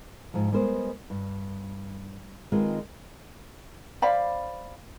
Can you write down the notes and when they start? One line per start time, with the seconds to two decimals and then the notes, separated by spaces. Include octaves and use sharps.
0.34 G#2 F3
0.52 G3 G#3 B3 A#4 C5
1.10 G2
2.52 D#3 G#3 C4 F4 G#4 B4
4.02 C5 D5 F5 B5